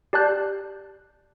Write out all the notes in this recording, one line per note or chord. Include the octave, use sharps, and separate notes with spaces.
G4 D5 A5 F#6 G6